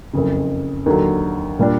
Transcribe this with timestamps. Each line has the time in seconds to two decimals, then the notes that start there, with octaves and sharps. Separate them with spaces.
0.13 F#1 F2 C#3
0.86 D#2 D3 F#3
1.59 A#2 G3 A#3 D4